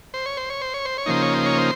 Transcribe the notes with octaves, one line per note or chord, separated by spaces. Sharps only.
C5
C#5
C5
C#5
C5
C#5
C5
C#5
C#3 F3 A#3 D#4 C5
C#5
C5
C#5
C5